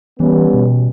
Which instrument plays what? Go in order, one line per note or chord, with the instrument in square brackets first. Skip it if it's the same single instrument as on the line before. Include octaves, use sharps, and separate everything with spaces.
[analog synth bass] E3 [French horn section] G3 B3 C#4
[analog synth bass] B2